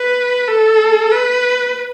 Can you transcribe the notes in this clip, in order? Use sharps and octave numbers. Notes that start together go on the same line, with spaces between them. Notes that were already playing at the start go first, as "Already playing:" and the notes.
Already playing: B4
A4
B4